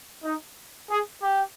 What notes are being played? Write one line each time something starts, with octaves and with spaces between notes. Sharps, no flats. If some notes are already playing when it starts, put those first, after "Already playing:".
D#4
G#4
G4